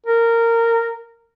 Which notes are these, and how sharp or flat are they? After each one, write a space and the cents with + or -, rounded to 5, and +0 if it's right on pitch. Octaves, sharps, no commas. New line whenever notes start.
A#4 -15